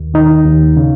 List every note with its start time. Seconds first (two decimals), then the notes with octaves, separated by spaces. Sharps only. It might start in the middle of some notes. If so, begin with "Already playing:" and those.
Already playing: D#2
0.14 D#3 D#4
0.45 D#2
0.77 C#3